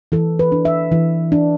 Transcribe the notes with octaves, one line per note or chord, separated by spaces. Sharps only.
E3 A4
B4
D4
E5
E3
D4